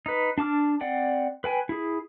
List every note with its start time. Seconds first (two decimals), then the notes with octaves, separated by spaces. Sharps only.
0.06 D#4 B4
0.38 D4 A5 D6 F6
0.81 C4 D5 F#5 G5
1.44 B4 G5 G#5
1.69 E4 G#4